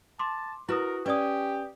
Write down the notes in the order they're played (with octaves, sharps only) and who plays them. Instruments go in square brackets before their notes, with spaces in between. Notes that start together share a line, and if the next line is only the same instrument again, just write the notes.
[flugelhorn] A5 [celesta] C6 D6
[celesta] E4 B4 D#6 [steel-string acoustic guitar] F#4 [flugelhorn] A#4
[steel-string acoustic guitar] C#4 G#5 [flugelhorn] G4 [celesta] B4 D5 D#6